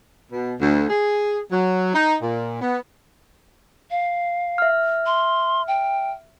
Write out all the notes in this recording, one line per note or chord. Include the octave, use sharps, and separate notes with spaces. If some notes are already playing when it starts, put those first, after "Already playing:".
B2
D2
G#4
F#3
D#4
A#2
B3
F5
E5 F6
C6
G5